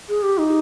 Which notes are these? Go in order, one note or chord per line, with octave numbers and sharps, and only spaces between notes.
G#4
G4
D#4